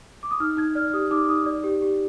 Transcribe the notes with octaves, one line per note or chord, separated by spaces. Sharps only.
D6
D#6
D#4 F6
D#4 G#6
D5 F6
F6
G4 D#6
D#4 D6
D#4 D#6
D5
G4
G4